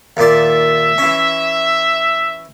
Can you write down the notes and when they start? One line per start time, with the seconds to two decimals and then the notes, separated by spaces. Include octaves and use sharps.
0.17 D#2 A#2 D5 E5
0.98 E3 C#4